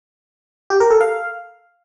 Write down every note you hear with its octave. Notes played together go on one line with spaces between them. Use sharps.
G4
A#4
A4
F5